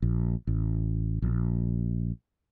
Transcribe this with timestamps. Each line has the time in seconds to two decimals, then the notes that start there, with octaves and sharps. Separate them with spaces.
0.02 A#1
0.47 A1
1.22 A#1